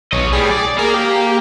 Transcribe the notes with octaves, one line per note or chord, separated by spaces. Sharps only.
B1 C#5 D#5
A2 G3 G#4
D5
A#3 G#4 A#4 F5
G4